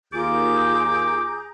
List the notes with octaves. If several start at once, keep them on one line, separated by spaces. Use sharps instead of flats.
D#2 F4 G#4 A#5 D6 G6